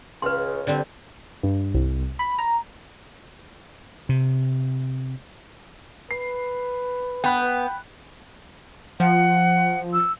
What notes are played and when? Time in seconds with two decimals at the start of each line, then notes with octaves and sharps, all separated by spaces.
0.22 C#2 C#3 B4 C6
0.67 D3 G3 C4
1.43 G2
1.74 C2
2.19 B5
2.38 A#5
4.09 C3
6.11 B4 C7
7.24 B3 G5 B5 F#6
9.00 F3 F#5
9.93 E6